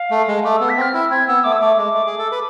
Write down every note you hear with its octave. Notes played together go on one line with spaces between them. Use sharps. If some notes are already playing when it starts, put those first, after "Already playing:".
Already playing: F5
A3
G#3
A3 D6
B3 E6
B6
C4 F6
E4 E6
C4 G#6
B3 E6
A3 D6
E6
A3 D6
G#3
A3
G#4
A4
B4